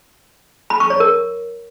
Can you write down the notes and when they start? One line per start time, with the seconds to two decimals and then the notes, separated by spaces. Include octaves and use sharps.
0.70 B5
0.80 C#6
0.90 C#5
1.00 A#4